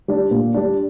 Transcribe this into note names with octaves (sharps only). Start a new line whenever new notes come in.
G3 D4
A#2
G3 D4